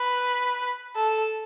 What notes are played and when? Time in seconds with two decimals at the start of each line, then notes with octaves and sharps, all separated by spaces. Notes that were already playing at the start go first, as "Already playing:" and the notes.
Already playing: B4
0.96 A4